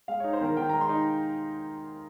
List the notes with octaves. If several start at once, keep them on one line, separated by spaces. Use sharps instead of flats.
G#3 F5
D#4 C#5
C5
D#3 A#4
D#3 G5
G#3 A#5
C6
D#4